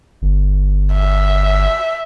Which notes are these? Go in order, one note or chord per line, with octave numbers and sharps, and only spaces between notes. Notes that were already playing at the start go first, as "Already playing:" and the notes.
G1
E5